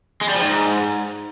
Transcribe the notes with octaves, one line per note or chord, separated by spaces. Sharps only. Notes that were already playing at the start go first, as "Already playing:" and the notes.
G#3
G3
F3
G#2